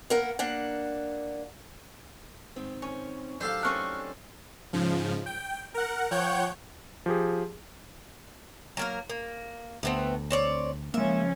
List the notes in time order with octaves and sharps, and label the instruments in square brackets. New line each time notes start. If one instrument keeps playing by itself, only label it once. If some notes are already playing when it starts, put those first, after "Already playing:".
[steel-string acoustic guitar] A#3 B3 A#4 F#5
A#3 D4 F#5
G#2 D#3 C4
[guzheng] C#4
[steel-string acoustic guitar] A2 F#3 D#4 [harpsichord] D4 A4 F5 [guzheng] G4 C5
[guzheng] A3 C4 C#4 [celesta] C#6 F6 F#6
[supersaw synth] G#2 C#3 F3
G5
A#4 F#5
F3 C#5 F#5 G5 G6
[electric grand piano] F3 G4 G#4
[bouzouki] F#3 A#3 A#4
A#3
[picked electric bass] D2 [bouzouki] A3 B3 C4
[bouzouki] C4 C#5 D5
[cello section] C#3 F3 C#4 [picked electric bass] G#3 A#3 [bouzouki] E5